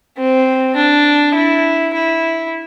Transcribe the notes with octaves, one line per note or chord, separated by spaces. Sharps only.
C4
D4
E4
E4